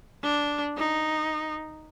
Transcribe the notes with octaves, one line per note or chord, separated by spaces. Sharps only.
D4
D#4